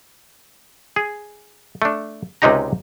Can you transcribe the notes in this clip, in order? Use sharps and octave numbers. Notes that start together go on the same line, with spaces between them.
G#4
A3 D4
C#2 C3 G#3 D#4 G4 A#5